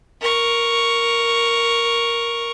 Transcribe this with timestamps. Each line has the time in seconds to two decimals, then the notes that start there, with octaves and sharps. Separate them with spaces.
0.21 A#4 C#6